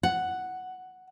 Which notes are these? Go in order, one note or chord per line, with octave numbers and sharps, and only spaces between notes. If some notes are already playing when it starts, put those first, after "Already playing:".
F#5